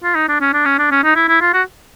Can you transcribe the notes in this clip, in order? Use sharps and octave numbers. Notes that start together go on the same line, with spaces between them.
F4
D#4
D4
C#4
D4
C#4
D4
C#4
D#4
E4
E4
F4
F#4